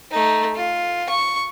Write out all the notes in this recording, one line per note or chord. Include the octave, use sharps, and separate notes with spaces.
A3 D#4
F4
C#6